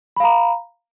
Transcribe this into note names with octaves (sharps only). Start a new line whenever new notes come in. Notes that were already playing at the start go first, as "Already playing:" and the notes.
F5 A#5 B5